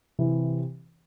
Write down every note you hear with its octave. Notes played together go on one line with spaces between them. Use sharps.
C3 E3